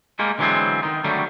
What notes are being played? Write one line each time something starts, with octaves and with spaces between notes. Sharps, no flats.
G3 G#3 A#3
D3 E3 F#3 G#3 B3 C4
D#3 D#4
D3 D#3 F#3 G3 A3